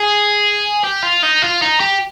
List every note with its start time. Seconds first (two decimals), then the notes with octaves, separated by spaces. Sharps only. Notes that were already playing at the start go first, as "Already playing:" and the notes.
Already playing: G#4
0.83 G4
1.02 F4
1.22 D#4
1.42 F4
1.62 D#4
1.80 G4